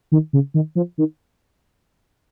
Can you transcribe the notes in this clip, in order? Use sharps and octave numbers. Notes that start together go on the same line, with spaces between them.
D#3
C#3
D#3
F3
D#3